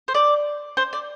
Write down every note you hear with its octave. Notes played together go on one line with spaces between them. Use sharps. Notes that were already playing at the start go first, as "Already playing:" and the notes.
C5
D5
C5
D5